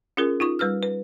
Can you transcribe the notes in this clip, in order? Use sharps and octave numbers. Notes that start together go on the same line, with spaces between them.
C#4 F4 G#4 A#4
D#4 F4 C#6
G3 B4 E6 F6
B4